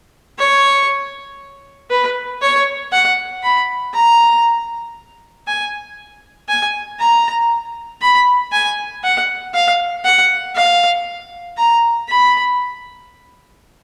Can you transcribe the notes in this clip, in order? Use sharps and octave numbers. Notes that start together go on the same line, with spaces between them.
C#5
B4
C#5
F#5
B5
A#5
G#5
G#5
A#5
B5
G#5
F#5
F5
F#5
F5
A#5
B5